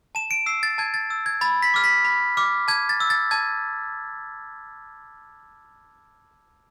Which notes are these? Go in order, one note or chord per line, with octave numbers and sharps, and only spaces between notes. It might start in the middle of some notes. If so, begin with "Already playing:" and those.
A5 E7
D7
E6 C7
A6
A5 G#6
A6
E6
G#6
B5 A6
B6
D6 F6
B6
B5
D6 F6
A5 G#6
A6
E6
A6
A5 G#6